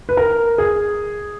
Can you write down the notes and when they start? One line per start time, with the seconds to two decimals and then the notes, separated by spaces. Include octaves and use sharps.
0.09 B4
0.17 A#4
0.58 G#4